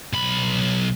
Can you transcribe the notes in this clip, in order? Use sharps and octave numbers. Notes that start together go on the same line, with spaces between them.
B1 B5